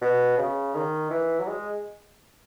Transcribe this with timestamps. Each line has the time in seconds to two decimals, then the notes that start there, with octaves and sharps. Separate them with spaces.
0.01 B2
0.38 C#3
0.74 D#3
1.10 E3
1.39 F#3
1.48 G#3